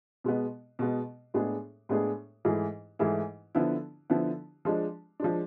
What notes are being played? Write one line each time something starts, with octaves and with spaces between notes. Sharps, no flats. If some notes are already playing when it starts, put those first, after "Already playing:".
B2 G#3 B3
B2 G#3 B3
A2 G#3 B3 D4 G#4
A2 G#3 B3 D4 G#4
G#2 E3 A3 E4 G#4
G#2 E3 A3 E4 G#4
D3 F3 B3 E4
D3 F3 B3 E4
F3 G#3 D4
F3 G#3 D4